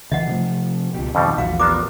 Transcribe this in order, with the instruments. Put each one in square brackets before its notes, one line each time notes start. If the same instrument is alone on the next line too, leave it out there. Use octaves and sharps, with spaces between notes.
[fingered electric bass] C#3 E3 [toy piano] D#5 F#5
[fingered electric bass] C3 F3 A3
[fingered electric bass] C#2 B2 [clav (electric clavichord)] G4
[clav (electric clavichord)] F2 B2 G3 [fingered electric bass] D#3
[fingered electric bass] A#1 E2 [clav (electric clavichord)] F#4 [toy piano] F5
[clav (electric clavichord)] B3 D4 A#4 [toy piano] G4 A#5 D6